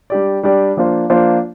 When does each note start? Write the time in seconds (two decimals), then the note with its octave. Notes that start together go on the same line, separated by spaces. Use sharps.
0.10 G3 D4 G4 D5
0.43 G3 D4 G4 D5
0.77 F3 A#3 D4 F4 C5
1.10 F3 A#3 D4 F4 C5